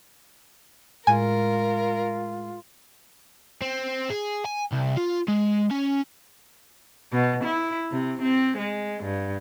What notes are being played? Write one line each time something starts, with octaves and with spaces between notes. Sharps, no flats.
A2 G#3 F4 A#4 G#5
C4
G#4
G#5
C2
F4
G#3
C#4
B2
E4
C3
C4
G#3
G2